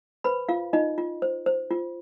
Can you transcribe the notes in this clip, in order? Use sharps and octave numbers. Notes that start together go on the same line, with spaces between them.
B4 C5 B5
F4 F5
D#4 F4 D#5
F4
C5
C5
F4